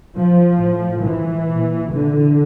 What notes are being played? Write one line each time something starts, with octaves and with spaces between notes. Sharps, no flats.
F3
A2
E3
A#2
D3